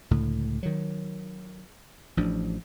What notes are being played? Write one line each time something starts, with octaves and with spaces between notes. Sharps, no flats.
C#2 A2 D3
D#3 F#3
A1 F3 D4